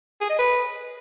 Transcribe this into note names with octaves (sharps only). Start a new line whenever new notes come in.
G#4
D#5
B4